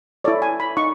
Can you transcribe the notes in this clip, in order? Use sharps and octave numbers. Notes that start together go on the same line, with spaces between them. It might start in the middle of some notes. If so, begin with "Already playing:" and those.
E4 A4 C#5 D5
G#5
B5
D#4 C#6